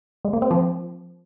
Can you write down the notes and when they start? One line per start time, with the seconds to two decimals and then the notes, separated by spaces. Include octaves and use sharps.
0.25 G#3
0.33 A#3
0.42 C4
0.51 F3